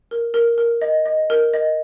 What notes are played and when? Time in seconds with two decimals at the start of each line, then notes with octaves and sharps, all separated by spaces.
0.11 A#4
0.34 A#4
0.58 A#4
0.82 D#5
1.06 D#5
1.30 A#4
1.54 D#5